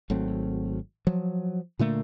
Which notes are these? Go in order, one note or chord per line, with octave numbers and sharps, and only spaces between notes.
G#1 F#3 A3 C4
F3 F#3
A#2 D3 A3 A#3